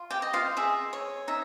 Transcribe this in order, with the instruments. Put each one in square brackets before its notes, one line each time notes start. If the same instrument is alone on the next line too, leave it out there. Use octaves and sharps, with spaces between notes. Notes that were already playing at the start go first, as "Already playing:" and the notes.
Already playing: [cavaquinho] F4
G4 G5
D#5
F4 F5
G#4 E5
C#5
D#4 E5